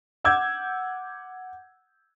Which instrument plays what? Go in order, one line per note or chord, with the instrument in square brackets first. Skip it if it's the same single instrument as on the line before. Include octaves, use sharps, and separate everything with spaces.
[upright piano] F#5 D6 E6 G6 G#6